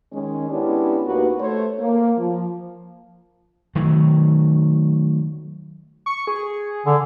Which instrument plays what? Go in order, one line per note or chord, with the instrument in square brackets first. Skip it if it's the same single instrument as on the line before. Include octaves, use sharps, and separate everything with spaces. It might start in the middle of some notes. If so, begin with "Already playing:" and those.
[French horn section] D#3 G#3 C#4
G#3 B3 C#4 D4 E4 G4
D2 A#3 D#4 F#4 G4 B4
A3 C5 C#5
A#3
F3
[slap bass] D#3 F#3 A3
[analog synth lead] C#6
G#4
[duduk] D3 [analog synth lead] G#4